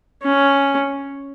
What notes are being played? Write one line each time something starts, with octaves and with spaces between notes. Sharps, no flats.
C#4